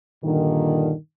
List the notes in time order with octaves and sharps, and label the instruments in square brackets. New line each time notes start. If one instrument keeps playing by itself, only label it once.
[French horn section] G2 A#2 D3 D#3